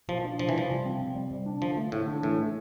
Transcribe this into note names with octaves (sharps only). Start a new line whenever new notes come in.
B2 F3
D4
C3 F3
E3
F3 G3
C3
C4
C3
G3
C3
D4
D3 F3
A3
A2 D3
D4
A2 E3
A3